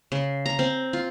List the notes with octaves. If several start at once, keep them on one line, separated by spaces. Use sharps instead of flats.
C#3
A#5
C4
F4